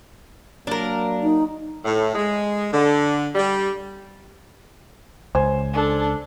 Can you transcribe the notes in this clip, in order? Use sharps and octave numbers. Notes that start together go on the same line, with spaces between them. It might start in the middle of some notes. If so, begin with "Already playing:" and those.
F#3 A#3 D4 A#4
D#4
A2
G#3
D3
G3
C#2 C5 G#5
D4 A4